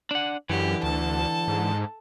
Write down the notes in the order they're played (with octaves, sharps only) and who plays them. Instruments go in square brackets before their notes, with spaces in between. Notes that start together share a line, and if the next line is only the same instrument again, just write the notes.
[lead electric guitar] D4 F#5
[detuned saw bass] F#2 [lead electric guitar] D3 E3 [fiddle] G4
[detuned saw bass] D2 [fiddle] A4 A5
[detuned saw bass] G#2